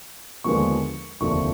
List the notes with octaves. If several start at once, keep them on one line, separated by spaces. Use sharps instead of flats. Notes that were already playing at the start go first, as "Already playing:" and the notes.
D#2 D3 F3 G#3 B3 C#6
F1 D#2 D3 F3 A3 C#6